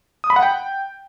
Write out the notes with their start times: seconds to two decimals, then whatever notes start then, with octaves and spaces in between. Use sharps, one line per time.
0.24 D#6
0.30 B5
0.36 F#5
0.42 G5